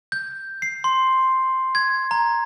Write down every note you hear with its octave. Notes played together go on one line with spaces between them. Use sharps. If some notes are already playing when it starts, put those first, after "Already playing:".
G6
C7
C6
G#6
A#5